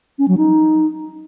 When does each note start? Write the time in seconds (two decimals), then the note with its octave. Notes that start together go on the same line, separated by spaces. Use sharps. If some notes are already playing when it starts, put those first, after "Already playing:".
0.19 C#4
0.28 F#3
0.38 D#4